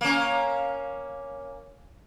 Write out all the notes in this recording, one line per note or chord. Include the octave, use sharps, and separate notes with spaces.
A#3 C#4